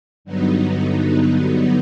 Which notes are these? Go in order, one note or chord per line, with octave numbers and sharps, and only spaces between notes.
G2 D3 F#3 B3 D#4